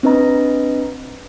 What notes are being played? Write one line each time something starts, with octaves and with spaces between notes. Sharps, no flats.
C4 D4 B4 D#5 A#5